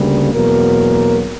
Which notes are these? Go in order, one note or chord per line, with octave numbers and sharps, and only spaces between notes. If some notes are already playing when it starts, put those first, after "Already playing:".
Already playing: D2 C#3 G3 A#3
E2 B2 F#3 A#3 A#4